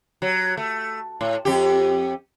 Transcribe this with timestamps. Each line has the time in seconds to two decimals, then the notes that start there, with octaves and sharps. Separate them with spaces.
0.22 F#3
0.57 A3
1.21 A2
1.45 F2 G4